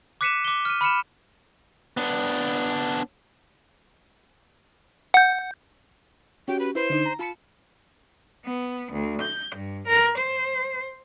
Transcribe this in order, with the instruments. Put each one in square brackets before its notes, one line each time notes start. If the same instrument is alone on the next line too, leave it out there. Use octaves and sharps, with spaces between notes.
[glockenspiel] D6 F#6 B6 C#7 D#7 E7
D6 G7
F6 D#7
B5 F6 C#7 E7
[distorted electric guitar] B3 D4
[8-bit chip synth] F#5 G6
[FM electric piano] C#4 F#4 G4 [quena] G5
[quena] B4
[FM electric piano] E4 B4 [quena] C5
[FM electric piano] D3 D#4
A#5
[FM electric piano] F4 B5 C#7 [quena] A5
[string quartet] B3
D2
G6
G2
A#4
C5